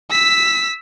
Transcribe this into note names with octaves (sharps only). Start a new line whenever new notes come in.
E6 B6